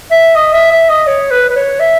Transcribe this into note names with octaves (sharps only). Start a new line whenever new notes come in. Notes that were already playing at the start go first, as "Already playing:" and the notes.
E5
D#5
E5
E5
D#5
C#5
B4
B4
C#5
E5